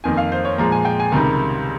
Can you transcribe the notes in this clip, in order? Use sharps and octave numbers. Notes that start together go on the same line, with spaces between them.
F2 D#3 A#3 G#5
F5
C5
C#5
A#2 F3 G#3 A#5
G#5
G5
G#5
C#2 C3 D#3 G3 A#5